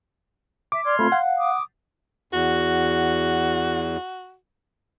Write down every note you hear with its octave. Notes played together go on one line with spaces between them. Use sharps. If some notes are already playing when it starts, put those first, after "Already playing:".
E5 D6
D5 C6 F6 G#6
A3 C4 F4 B5
F5 F#5
D6 D#6
E2 F#4